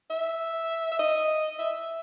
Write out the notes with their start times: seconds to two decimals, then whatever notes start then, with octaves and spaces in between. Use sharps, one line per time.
0.10 E5
0.92 E5
0.99 D#5
1.59 E5